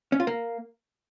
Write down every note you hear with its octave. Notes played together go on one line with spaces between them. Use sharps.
C#4
F4
A#3